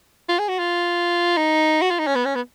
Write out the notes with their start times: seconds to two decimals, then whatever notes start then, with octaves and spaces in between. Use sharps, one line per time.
0.29 F4
0.39 G#4
0.49 F#4
0.59 F4
1.37 D#4
1.82 F#4
1.90 F4
1.99 D#4
2.07 C#4
2.15 B3
2.25 C#4
2.35 B3